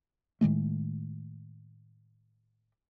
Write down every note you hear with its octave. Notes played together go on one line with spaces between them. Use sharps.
A2 D#3 G#3 A3